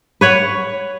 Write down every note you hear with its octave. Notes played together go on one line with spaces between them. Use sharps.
B4 C#5 F#5